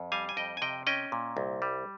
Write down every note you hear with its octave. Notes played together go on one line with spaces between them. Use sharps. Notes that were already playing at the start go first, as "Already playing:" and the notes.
Already playing: F2
G3 F5 G#5
G#5
F2 D#5 G5
G#5
C3 D#5 G5
C#4 D#5 G5
A#2
C2
G3